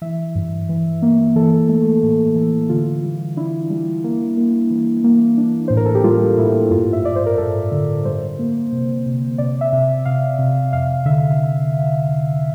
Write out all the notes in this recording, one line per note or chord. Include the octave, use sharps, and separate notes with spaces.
E3 E5
G2
E3
A#3
E3 A4
A3
A2
E3
D3 F4
G3
D4 E4
G3
A#3
A#3
E3
A#3
D4
A2 C5
A#4
A4
G4
G3 F4
A2 E4
G2 F4
E5
G2 D5
C5
A#4
G2 A4
D3
G3 C5
A#3
C3
C3
C3 D5
E5
C3
C3 F5
C3
F2 F5
D3 E5